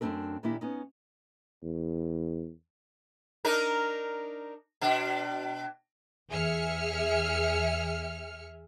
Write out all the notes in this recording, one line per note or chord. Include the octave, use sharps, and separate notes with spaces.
F#2 A3 A#3 C4 D4 A#4
A#2 D#3 A#3 D4 E4 G4
B3 C#4 D#4
E2
D4 D#4 A#4
B2 D4
E2 G#4 E5 F6 C#7